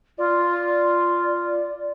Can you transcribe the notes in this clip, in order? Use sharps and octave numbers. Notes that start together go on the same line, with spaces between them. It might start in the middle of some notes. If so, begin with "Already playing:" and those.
F4 D5